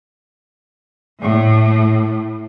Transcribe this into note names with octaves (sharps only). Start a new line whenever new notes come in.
A2